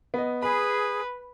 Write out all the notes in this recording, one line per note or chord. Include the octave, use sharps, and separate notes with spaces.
B3 D#5
G#4 B4 B5